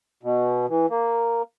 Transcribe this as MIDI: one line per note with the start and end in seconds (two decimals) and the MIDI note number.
0.23 0.66 47
0.69 0.86 52
0.90 1.42 58